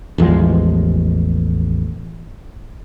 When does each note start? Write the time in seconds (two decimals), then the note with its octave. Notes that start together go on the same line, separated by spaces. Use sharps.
0.18 A1 E2 F3 G#3